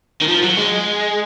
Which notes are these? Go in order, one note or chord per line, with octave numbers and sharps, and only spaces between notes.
D#3
F3
F#3
G#3